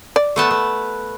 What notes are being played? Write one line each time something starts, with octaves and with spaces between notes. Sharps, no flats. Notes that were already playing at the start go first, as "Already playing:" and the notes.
D5
A3 B3 A5
B3